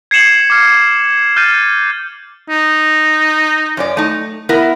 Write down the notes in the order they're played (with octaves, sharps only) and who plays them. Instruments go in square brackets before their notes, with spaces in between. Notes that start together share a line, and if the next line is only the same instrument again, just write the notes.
[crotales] G#6 C7 C#7 E7 F#7
D6 F6
F6 G6 A6 C7 D#7
[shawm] D#4
[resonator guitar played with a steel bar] F#2 C#4 D5
A3 D#4
B3 E4 A#4